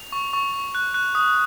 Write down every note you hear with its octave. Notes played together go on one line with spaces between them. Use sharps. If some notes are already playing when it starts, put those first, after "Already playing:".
Already playing: F7
C#6
C#6
C#6
F#6
F#6
D#6